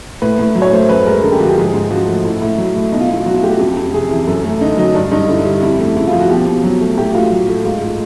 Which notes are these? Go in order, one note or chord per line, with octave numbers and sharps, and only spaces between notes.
A2 B4
A2
F#3
C#5
A3 C5
F#2 B4
G#3 A#4
D3 A4
G4
F3 F#4
G4
G#2 G#4
G#2
F3 F#4
A3
A2 E4
A2
F#3
A3
B2 D#4
F4
B2 E4
F4
F#3 F#4
F4
A3 G4
F#4
F2 G4
F2
C3 G#4
E3
F#2 A4
A3
D3 D#4
F#3 D#4
G2 D4
G2 D#4
D3 E4
G3
F2 E4
A3
C#3 E4
F4
F3
F#4
B2 G4
B2
F#3
A3
A2 G4
F#4
A2 F4
F#3
A3
G#2 F4
A3